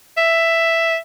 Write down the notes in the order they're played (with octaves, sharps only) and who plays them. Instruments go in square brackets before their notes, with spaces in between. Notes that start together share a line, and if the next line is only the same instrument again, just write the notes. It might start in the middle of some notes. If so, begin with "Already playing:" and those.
[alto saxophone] E5